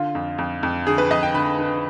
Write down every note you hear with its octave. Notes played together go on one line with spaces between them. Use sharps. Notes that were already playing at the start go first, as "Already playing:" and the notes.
Already playing: D3 F4
F2
F2
F2
D3 G#4
B4
F2 D#5
G5
D3 B5
D3